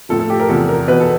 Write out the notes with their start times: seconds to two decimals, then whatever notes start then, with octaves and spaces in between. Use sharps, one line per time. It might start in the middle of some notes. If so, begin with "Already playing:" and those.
0.09 A2 F3 A4
0.19 A4
0.30 G4
0.40 A#4
0.49 E2 C3 F3 A4
0.69 A#4
0.88 E2 B2 B4
1.00 A4